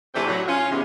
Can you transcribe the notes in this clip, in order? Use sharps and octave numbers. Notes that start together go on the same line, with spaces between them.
A2 C3 E3 A3 C4 D4
A2 F#3
C#4 F4
E2 C3